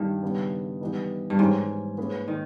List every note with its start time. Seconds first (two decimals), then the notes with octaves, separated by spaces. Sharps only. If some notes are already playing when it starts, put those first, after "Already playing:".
Already playing: G2 D#3
0.23 C#3 G3 B3
0.81 E3 G3 B3 D#4
1.30 G2
1.39 G#2 E3 G3 C#4
1.98 A#3 C#4 G#4 B4
2.28 D#3